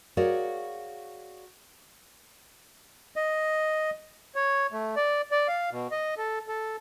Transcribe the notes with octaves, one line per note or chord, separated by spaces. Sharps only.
F#4 G#4 A#4 C#5 D5 F5
D#5
C#5
A3
D5
D5
F5
B2
D#5
A4
A4